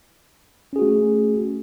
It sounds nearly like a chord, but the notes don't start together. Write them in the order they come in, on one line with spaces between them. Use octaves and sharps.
C#4 G#4 F#4 A3